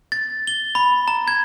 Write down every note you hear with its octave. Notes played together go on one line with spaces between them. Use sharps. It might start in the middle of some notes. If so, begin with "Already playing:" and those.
A6
G7
B5
A#5
G#6